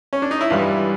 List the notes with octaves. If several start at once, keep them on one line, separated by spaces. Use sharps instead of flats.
C#4
D4
D#4
E4
G2 E3 G3 F4